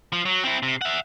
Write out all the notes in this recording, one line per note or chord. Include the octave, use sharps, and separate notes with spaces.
F3
F#3
C4 E4
C3
E5 F#5